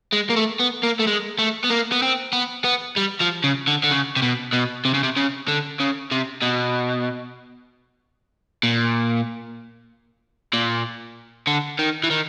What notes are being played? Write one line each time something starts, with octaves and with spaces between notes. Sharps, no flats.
G#3
A#3
A3
B3
A#3
A3
G#3
A3
B3
A#3
B3
C4
B3
B3
G3
F3
C#3
D3
D3
C#3
C3
B2
B2
C3
C#3
C3
C#3
D3
C#3
C3
B2
A#2
A#2
D3
D#3
E3
D#3